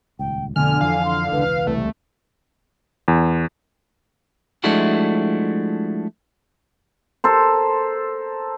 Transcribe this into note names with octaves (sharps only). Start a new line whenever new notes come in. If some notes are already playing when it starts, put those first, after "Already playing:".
D#1 C#2 G5
F2 B2 D3 A3 G#5 F6
F2 E3 F3 F5
C6
E1 C#2 E3 B4
C2 A3
E2
F3 G#3 A3 D4 E4 F#4
A4 A#4 C5